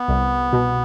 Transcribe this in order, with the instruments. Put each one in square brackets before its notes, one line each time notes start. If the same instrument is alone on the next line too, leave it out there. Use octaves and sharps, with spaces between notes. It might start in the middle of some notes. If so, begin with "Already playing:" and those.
Already playing: [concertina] B3
[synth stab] C2
B2